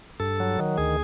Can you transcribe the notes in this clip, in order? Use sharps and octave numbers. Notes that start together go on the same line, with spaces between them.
G2 A4
F#3
D#3
D2 G#4